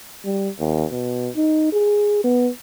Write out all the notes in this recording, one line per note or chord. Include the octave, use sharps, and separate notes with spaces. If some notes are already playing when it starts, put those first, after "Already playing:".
G3
D#2
B2
D#4
G#4
B3